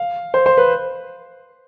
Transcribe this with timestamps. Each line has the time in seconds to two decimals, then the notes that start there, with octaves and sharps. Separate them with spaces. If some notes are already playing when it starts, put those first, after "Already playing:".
Already playing: F5
0.34 C5
0.46 C5
0.58 B4